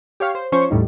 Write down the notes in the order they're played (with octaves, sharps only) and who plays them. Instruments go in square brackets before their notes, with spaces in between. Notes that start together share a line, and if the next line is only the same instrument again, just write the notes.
[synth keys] G4 C#5 F5
C5
F3 C#4 C5 C#5 C#6
E2 A2 G3 D#4